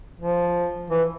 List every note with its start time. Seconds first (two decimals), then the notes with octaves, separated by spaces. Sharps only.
0.20 F3
0.90 E3